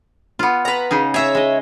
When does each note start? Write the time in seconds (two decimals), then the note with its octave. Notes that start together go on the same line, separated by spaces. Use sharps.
0.39 B3 F4
0.65 B4 A#5
0.91 C#3 D#4 G#4
1.14 G#4 C#5 E5 A#5
1.35 G#3 D#5